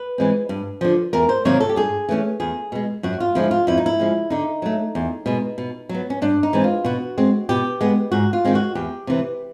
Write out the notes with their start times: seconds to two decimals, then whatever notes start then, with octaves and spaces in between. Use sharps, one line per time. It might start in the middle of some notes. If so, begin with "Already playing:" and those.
Already playing: B4
0.18 E3 G#3 C4
0.49 G2
0.81 D3 F3
1.13 E2 A#4
1.29 C5
1.45 C3 D#3 F#3 A#3 C#5
1.60 A4
1.69 G4
1.76 G2 G#4
2.09 E3 A3 C#4
2.40 E2 G#4
2.72 B2 G#3
3.03 F#2 F#4
3.20 F4
3.35 D3 F3 G#3 E4
3.51 F4
3.67 F2 E4
3.78 D#4
3.86 E4
4.00 C#3 F3 G#3
4.30 D3 D#4
4.62 F#3 A3
4.95 E2
5.26 B2 G#3
5.58 B2
5.89 F#3
5.94 B3
6.10 C#4
6.22 G2 D4
6.43 D#4
6.53 E3 G#3 C4
6.64 F4
6.84 B2 F#4
7.18 G#3 C4
7.49 B2 G4
7.81 G#3 B3
8.12 G#2 F#4
8.33 F4
8.44 D#3 G#3 C4
8.55 F#4
8.75 E2 G4
9.07 C3 E3